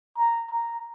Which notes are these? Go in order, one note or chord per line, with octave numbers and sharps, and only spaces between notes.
A#5
A#5